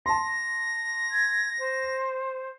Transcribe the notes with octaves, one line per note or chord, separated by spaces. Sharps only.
A5 C6 A#6
G#6
C5